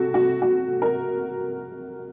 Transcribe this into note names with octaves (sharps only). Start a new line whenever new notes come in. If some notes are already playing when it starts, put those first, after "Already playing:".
Already playing: C3 F#4 A4
F#4
F#4
A#4